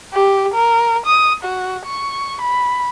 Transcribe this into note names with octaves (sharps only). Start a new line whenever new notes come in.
G4
A#4
D#6
F#4
C#6
B5